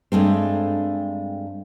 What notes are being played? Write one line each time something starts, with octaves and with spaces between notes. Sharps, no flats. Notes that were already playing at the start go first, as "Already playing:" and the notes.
G2 G#3 A3 C4